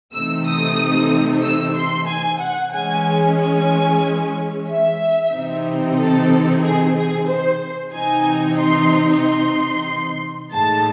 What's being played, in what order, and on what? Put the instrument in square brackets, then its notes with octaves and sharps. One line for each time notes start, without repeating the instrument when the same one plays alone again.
[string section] C3 E3 A3 C4 D#4 E6
D#6
E6
C6
G#5
F#5
E3 G#3 C#4 G#5
G#5
E5
C3 E3 C4 D#4
A4
G#4
G#4
C5
C3 E3 C4 D#4 G#5
C6
C6
A2 G#3 D#4 A5